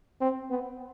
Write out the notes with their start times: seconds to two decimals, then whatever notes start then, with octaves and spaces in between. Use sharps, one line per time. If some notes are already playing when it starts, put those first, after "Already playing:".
0.21 C4
0.51 B3